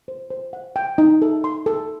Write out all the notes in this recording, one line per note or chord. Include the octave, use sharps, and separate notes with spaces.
C5
C5
F#5
G5
D#4
A4
C6
A4